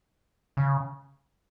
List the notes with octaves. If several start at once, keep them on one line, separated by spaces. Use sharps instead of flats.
C#3